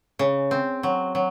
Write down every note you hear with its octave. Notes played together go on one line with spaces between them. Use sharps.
C#3
C4
F#3
F#3